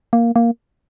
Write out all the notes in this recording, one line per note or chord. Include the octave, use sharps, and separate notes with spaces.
A#3
A#3